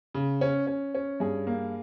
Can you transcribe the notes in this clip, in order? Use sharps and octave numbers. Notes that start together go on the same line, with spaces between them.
C#3
C#4
C#4
C#4
G2 G#4
A#3